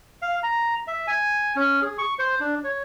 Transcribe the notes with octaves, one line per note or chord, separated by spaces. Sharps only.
F5
A#5
E5
G#5
C#4
G#4
C#6
C5
D4
C#5